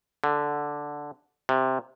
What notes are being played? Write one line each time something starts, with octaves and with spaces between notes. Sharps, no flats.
D3
C3